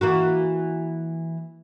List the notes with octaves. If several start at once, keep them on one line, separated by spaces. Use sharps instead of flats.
E3 A#3 F#4